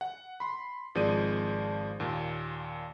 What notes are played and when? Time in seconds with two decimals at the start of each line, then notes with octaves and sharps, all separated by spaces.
0.01 F#5
0.40 B5 C6
0.95 G#1 F3 G#3 C4 D5 D#7
2.00 D#2 A#2